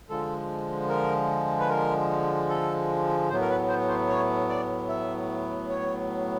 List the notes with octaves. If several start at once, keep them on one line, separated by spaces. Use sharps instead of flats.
D3 F3 G#3 A4
A#4
B4
A#4
A4
A2 F#3 B3 C5
A#4
B4
C5
C5
C#5
D5
E5
C#5